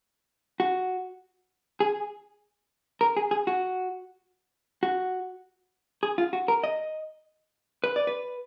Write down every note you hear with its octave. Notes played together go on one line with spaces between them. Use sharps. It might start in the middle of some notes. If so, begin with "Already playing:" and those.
F#4
G#4
A#4
G#4
G#4
F#4
F#4
G#4
F4
F#4
A#4
D#5
B4
D5
B4